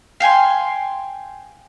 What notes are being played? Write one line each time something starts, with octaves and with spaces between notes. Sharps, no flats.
F5 G5 G#5 C6